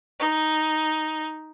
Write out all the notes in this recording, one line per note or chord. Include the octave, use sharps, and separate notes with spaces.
D#4